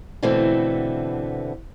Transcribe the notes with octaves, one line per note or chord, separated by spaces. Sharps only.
B2 D3 E3 A3 B3 C4